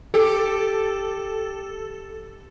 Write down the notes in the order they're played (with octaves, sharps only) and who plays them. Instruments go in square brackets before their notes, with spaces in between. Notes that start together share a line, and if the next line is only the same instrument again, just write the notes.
[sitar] G4 [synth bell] A4